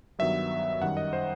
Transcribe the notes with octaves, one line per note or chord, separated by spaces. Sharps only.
G2 D#3 F#3 B3 E5
F#2 D#3 G3 F#5
D#5
C5